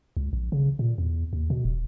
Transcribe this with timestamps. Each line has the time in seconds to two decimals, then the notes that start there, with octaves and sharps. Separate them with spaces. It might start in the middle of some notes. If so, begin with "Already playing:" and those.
0.17 C#2
0.33 A#1
0.52 C#3
0.79 A#2
0.98 E2
1.33 D#2
1.50 B2
1.65 D#1